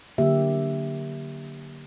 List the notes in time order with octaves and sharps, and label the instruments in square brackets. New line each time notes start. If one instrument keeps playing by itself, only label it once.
[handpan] D3 F#3 A#3 G4 E5